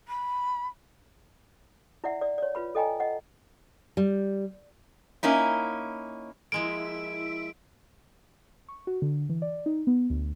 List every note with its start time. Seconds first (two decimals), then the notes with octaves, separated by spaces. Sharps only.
0.08 B5
2.04 E4 D5 E5 F#5
2.22 D5
2.38 C#5 D5
2.55 F4 B4 B5
2.75 A4 D#5 G5 G#5 A#5
3.00 D#5 F#5
3.97 G3
5.23 A#3 C#4 D#4 E4
6.52 F3 G#3 A#3 E4 E5 D7
8.69 C#6
8.87 F#4
9.02 D3
9.29 E3
9.42 D5
9.66 D#4
9.87 B3
10.10 D2